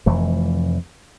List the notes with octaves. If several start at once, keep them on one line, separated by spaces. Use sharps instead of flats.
F1 F2 E3 A3